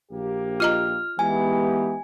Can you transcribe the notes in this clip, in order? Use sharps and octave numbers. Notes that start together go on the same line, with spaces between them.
A#1 A#3 G4
F4 D#5 A#5 F6
E3 G#3 B3 D#4 G4 G#5